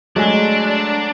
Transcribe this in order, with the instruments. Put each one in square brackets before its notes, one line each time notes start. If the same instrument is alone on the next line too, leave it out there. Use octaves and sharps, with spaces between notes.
[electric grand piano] F#3 A3 [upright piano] G#3 G#5 [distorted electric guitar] D4